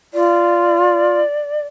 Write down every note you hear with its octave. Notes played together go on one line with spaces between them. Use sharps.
F4 D5